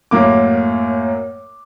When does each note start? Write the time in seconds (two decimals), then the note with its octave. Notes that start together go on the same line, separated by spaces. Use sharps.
0.11 F#2 A2 A#3 D6